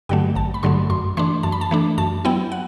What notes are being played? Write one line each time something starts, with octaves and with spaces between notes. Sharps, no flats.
G2 D3 F#3 A3 G5
A1 A5
B5
G2 D3 F#3 A3 C6
F#2 C6
E3 A3 D4 C6
F#2 A5
B5
A5
E3 A3 D4
F#2 A5
F#3 B3 E4 G5
F#5